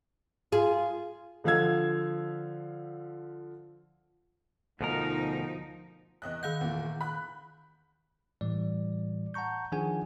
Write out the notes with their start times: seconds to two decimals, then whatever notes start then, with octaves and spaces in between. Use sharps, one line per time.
0.52 F4 G#4
1.44 D3 F3 F5 E6 G#6
4.81 D2 B2 F3 D#4 A#4
6.22 E2 D#5 F#6
6.43 D#3 F5 F#5 G6
6.61 E2 A#2
7.01 B5 F#6
8.41 A2 E3 G3 D5
9.34 F#5 A5 A#5 C#6 G6
9.72 D#3 F3 D4 G#4 F#5 G#5